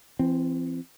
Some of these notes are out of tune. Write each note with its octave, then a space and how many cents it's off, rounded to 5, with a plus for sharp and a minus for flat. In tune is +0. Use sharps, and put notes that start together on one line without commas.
E3 +35 C4 +0